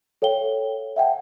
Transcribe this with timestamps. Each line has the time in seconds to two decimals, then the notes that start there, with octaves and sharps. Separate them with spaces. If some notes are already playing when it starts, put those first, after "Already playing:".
0.22 A4 C#5 F5 G5 G7
0.96 E5 F#5 G5 A5